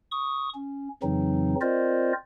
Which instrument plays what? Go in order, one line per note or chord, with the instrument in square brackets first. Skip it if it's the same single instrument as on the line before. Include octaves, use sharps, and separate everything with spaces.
[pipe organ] C#6 D#6
C#4
F2 C#3 E3 F#3 C4 D#4
C4 F4 A#4 C5 D5 D#5